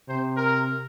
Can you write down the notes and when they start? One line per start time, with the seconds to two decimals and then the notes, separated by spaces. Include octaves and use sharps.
0.09 C3 C5
0.37 A#4